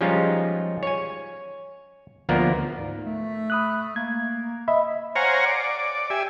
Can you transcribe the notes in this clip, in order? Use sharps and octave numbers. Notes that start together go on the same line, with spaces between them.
F3 G3 G#3 C#4 D#4 F4
C#5 G#5
D2 F3 A#3 B3 A#4 D5
G#2
A3
B5 D#6 F#6
A#3 G#6
D#5 E5 B5
C5 C#5 F5 F#5 G#5 A#5
D5
G4 E5 G#5